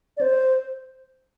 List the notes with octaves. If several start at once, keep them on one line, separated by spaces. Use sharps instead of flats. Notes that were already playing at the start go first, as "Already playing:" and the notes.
D5
C5